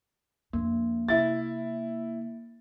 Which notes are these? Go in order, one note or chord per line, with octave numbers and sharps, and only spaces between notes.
F2 A#3 D4
C3 E4 A6